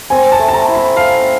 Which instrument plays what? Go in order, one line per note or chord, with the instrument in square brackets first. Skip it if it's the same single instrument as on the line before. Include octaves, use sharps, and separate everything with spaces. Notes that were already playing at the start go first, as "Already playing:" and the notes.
[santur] C4 [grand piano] G#5
[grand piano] A5
[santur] A3
[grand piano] A5
A#5
[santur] E4
[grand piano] B5
[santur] A4 [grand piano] F5